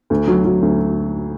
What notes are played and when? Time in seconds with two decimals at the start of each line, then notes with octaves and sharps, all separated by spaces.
0.10 D2
0.27 F#3
0.45 F#3
0.62 D2